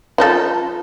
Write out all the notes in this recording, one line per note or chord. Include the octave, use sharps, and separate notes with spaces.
F3 D#4 A4